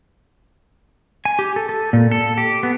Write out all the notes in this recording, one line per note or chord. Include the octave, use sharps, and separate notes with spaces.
G#5
G4
A4
A4
A#2
A4
G4
B3